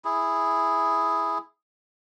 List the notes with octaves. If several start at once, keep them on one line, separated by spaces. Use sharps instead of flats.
E4 G#4